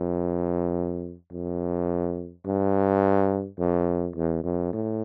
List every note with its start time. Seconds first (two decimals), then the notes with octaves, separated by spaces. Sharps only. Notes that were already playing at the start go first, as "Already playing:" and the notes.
Already playing: F2
1.32 F2
2.46 G2
3.59 F2
4.16 E2
4.44 F2
4.73 A2